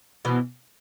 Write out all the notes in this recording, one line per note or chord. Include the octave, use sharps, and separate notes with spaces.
B2 E3